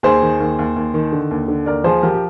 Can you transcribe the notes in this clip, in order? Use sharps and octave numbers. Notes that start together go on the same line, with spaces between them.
D#2 G#4 C5
D#3
D#2
D#2
D#2
D#3
D3
D#2
D3
D#2 A#4 D5
F3 G#4 C5
F3 G4 A#4
G4